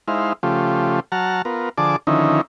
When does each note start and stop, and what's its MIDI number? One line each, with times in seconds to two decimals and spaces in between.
0.08 0.33 56
0.08 0.33 63
0.08 0.33 64
0.08 0.33 72
0.08 0.33 77
0.43 1.00 49
0.43 1.00 53
0.43 1.00 57
0.43 1.00 65
0.43 1.00 67
1.12 1.42 54
1.12 1.42 78
1.12 1.42 81
1.12 1.42 82
1.12 1.42 89
1.45 1.69 59
1.45 1.69 65
1.45 1.69 70
1.78 1.96 50
1.78 1.96 53
1.78 1.96 68
1.78 1.96 74
1.78 1.96 81
1.78 1.96 86
2.07 2.41 50
2.07 2.41 51
2.07 2.41 53
2.07 2.41 61
2.07 2.41 63
2.07 2.41 64